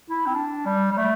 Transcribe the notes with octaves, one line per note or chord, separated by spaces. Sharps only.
E4
C4
D4
G3
G3
A3